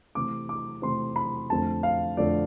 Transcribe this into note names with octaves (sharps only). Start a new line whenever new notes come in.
C3 E3 A3 C4 D6
D6
C3 E3 A3 C4 C6
B5
F2 D3 A3 C4 A5
F5
F2 D3 A3 C4 D5